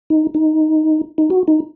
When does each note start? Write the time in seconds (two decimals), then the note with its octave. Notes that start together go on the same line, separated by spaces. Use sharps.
0.10 D#4
0.35 D#4
1.18 D#4
1.30 F#4
1.48 D#4